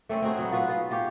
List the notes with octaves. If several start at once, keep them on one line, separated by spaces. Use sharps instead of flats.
A3 C4 C#4
C4 D#4 F#4 G#4
F#3 B3
F4 F#4 B4
F4
F4 G4 C#5